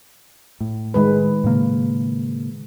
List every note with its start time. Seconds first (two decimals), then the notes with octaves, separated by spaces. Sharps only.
0.60 A2
0.94 D#3 G#3 B4
1.44 A2 C#3 A#3